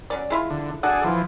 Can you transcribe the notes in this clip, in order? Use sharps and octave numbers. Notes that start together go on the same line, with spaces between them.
F#3 C#4 D5
G#3 E4 F4
D3
D4 F#4 G#4 A4 F#5
E3 F3